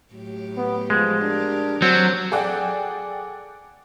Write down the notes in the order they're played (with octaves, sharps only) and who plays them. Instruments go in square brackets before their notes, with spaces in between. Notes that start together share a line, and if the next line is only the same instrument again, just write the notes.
[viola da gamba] A2 F#3 G4
[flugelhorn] B3
[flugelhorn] F3 [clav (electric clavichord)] G#3
[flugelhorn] D4 [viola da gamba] G4 A#4
[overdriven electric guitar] F#3 [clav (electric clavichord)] C4
[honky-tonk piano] G#4 A4 D5 F#5 G5